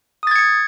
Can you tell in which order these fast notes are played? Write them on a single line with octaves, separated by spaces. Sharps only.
D#6 A6 G#6 C#7